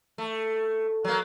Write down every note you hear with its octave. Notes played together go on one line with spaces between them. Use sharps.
A3
F#3 A#3